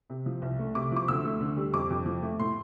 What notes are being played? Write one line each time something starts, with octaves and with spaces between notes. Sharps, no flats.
C3
F3
C2
A3
C3 D6
F3 D6
D2 E6
A3
D3
G3
F2 D6
F2
F3
A3
A2 C6